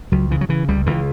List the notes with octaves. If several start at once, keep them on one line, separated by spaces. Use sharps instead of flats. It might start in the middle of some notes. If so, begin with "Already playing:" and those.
C#2 F#3
C#3 E3
F#3
C#3 E3
C#2 G3
C#2 E3